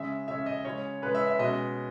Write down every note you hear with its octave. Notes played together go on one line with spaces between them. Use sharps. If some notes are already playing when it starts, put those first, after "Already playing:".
Already playing: C#3 G#3 C#4 E5
C#3 G#3 C#4 E5
D#5
C#3 G#3 C#4 C#5
C#3 G#3 C#4 B4
E5
E5
B2 G#3 C#4 D#5